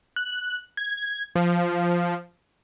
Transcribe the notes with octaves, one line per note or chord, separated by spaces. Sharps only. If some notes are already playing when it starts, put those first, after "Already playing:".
F#6
G#6
F3